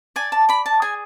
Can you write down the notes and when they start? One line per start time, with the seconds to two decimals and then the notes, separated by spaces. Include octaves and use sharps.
0.16 D5 G#5
0.32 A5
0.49 D5 B5
0.66 A5
0.82 G#4 G#5